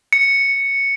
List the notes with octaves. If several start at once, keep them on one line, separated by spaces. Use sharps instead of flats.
C#7